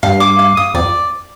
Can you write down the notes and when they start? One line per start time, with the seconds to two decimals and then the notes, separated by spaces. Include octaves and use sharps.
0.03 G2 F5
0.20 D6
0.39 F5
0.57 D#6
0.74 F2 D5